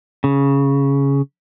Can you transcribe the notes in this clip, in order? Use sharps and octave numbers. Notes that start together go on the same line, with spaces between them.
C#3